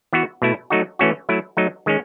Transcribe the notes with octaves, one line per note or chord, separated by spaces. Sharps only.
E3 B3 F#4
B2 A3 E4
F#3 A3 D#4 F#4
E3 A3 C#4 F#4
F#3 A3 E4
F#3 A3 D#4
D#3 G#3 C#4